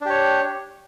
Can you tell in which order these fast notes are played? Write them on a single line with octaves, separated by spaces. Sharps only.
D4 G4 C#5